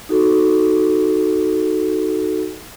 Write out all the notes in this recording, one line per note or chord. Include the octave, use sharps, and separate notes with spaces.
D#4 F#4 A4